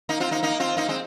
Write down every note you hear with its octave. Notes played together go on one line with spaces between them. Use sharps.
A#3 D#4
C4 F4
A#3 D#4
A#3 D#4
C4 F4
A#3 D#4
G#3 C4